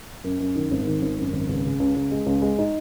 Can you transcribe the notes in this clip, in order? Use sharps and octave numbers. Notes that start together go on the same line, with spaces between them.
F#2
F#2
D#3
G#1
D#3
G#1
F#2
G#1
C#2
C#3
C#2
C#2
G#3
C#2
G#3
D#4